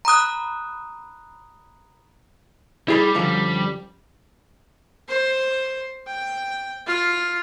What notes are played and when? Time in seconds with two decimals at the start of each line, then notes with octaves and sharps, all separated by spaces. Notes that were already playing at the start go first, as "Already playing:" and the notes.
0.05 A#5 B5 D#6 F#6
2.88 G3 E4 G#4 B5
3.15 F#2 D3 F3
5.08 C5
6.07 G5
6.87 F4